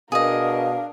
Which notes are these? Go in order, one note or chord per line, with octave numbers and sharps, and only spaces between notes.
B2 D4 G#4 A#4 D#5 F5